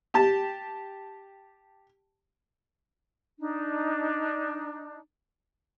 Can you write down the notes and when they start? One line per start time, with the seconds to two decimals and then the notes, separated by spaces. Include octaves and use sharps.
0.14 G4 A5
3.38 D4 D#4